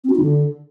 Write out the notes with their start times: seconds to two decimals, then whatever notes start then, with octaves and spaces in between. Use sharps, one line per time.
0.04 C4
0.10 F#4
0.15 D#4
0.21 D3